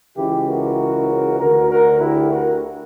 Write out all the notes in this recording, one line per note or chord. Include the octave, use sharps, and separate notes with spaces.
C#2 C#3 E3 E4 G4
F#4 A#4
D2 D3 F#4 A#4
F#4 A#4
E4 G4
F#4 A#4